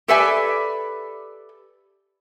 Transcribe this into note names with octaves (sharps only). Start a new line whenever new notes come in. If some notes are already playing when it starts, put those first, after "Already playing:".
G4 A4 B4 D5 E5 G#5